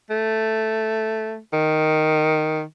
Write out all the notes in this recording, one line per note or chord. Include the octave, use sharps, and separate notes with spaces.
A3
D#3